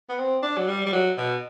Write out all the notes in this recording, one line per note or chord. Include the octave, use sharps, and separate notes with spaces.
B3
C4
D4
F#3
G3
G3
F#3
B2